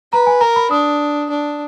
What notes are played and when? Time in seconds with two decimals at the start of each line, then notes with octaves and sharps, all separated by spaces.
0.12 B4 A#5
0.27 G#5
0.41 A#4 A#5
0.56 B5
0.71 D4 D#6
1.30 D4